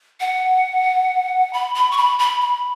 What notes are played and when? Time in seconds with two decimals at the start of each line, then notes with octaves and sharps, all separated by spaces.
0.20 F#5
1.53 B5
1.75 B5
1.91 C#6
1.97 B5
2.19 B5
2.41 B5